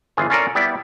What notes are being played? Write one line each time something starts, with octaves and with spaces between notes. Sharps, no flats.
G1 E3 F4 G#4
C#4 F4 A4 A#4 D5 A#5
G3 B3 E4 D5